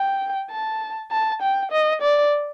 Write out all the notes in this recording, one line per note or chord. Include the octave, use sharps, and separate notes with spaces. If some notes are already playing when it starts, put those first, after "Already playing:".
Already playing: G5
A5
A5
G5
D#5
D5